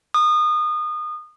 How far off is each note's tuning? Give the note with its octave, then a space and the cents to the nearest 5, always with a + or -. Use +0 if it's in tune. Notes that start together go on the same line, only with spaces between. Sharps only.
D#6 -25